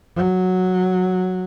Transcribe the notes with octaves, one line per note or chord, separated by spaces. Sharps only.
F#3